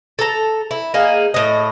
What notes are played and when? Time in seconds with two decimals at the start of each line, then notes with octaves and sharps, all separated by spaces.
0.19 A4 A#5
0.71 E4
0.94 A#3 D#4 G#4
1.34 A2 D#5